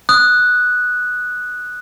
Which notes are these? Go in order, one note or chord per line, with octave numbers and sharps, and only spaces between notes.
D#6 F#6